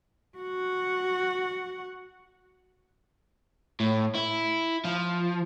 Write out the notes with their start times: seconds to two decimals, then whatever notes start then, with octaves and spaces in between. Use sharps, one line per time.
0.38 F#4 F#5
3.80 A2
4.15 E4
4.85 F3